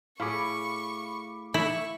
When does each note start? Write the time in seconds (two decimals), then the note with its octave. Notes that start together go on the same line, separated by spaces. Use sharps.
0.20 A2 G#4 F5 B5 C#6 D6
1.54 E4 C#6